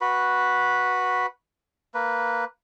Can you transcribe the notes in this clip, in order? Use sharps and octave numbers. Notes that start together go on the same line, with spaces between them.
F#4 B4 B5
A#3 B4